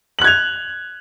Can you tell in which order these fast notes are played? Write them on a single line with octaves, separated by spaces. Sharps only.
F#7 F#6 G#6 F7